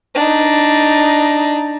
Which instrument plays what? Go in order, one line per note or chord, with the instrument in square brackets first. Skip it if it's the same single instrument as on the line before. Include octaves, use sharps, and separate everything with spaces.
[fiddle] D4 D#4